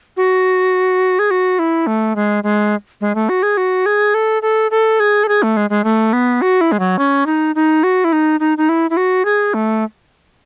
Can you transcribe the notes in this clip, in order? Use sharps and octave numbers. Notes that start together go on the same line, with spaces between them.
F#4
G#4
F#4
E4
A3
G#3
G#3
G#3
A3
F#4
G#4
F#4
G#4
A4
A4
A4
G#4
A4
G#4
A3
G#3
G#3
A3
B3
F#4
E4
G#3
F#3
C#4
D#4
D#4
F#4
E4
D#4
D#4
D#4
E4
E4
F#4
G#4
A3